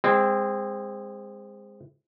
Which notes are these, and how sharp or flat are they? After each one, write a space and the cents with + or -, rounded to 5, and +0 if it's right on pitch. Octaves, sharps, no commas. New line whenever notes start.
G#3 -25 C4 +0